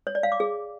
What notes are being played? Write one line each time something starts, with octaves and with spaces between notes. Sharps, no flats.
C#5
D5
F5
D6
G#4